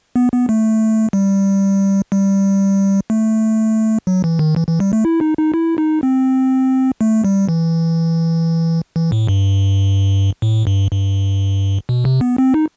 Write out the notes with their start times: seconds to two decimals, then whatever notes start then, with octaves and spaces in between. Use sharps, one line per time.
0.16 B3
0.32 B3
0.49 A3
1.13 G3
2.12 G3
3.10 A3
4.07 F#3
4.24 E3
4.39 D#3
4.56 E3
4.68 E3
4.80 G3
4.93 A3
5.05 E4
5.21 D#4
5.38 D#4
5.54 E4
5.78 D#4
6.03 C4
7.01 A3
7.24 G3
7.49 E3
8.96 E3
9.12 A2
9.28 G2
10.42 A2
10.67 G2
10.91 G2
11.89 B2
12.05 C3
12.21 B3
12.38 C4
12.54 D#4